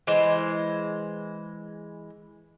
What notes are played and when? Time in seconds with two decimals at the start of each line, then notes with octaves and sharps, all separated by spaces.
0.07 E3 G#3 C5